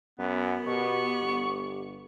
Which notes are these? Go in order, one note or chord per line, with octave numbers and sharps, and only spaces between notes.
F#2 B3
B2 G4 C#6
G1